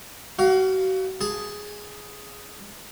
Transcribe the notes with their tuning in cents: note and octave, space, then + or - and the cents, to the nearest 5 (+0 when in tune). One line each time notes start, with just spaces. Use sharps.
F#4 +35 F5 +0
G#4 +0 A5 +0